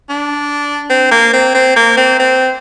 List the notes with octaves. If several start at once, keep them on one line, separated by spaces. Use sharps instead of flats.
D4
C4
A#3
C4
C4
A#3
C4
C4